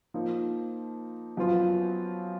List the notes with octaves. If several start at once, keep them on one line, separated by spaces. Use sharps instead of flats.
F3 A#3 D#4
F#2 F3 B3 F4